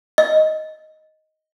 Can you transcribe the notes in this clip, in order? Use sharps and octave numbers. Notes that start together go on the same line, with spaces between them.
D#5